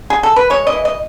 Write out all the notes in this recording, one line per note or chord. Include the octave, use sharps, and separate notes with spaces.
G#4
A4
B4
G#3 C#5
D#5
E3
D#5